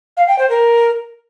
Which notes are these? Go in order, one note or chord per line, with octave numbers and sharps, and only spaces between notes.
F5
G5
C5
A#4